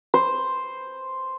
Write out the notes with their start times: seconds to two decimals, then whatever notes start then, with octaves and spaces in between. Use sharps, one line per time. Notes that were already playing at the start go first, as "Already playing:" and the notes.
0.14 C5